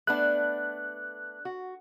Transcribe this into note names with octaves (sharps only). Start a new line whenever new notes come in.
A3 B3 D4 F#6
F#4